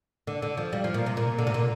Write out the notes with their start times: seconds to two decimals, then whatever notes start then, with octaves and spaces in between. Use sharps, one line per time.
0.27 D3
0.42 D3
0.57 F3
0.73 G3
0.84 F3
0.94 A#2
1.06 C3
1.17 A#2
1.39 D3
1.47 C3
1.54 A#2